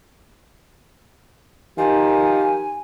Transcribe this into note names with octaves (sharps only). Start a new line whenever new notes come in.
D#3 F3 D#4 G4 G#5